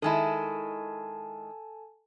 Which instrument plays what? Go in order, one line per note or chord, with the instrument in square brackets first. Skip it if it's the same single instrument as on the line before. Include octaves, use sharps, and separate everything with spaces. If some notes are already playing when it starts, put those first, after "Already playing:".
[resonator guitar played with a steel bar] D#3 G#3 E4 [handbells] A4 G#5 A5